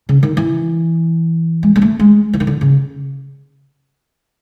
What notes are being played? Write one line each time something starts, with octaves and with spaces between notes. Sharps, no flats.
C#3
D#3
E3
G#3
G#3
A3
G#3
E3
D#3
D3
C#3